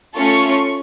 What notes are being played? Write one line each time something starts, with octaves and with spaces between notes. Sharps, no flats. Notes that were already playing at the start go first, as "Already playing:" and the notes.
A3 C#4 F4 A4 C#6